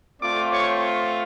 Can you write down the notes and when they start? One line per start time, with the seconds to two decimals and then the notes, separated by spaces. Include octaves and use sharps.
0.21 A3 C4 F4 D5 D6
0.52 C#5 C#6